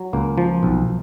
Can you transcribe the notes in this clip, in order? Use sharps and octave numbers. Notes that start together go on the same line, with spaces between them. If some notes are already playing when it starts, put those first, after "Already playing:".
Already playing: F#3
C#2 A#3
F3
B1